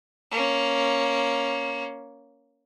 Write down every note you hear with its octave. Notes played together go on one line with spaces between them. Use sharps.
A#3 C#4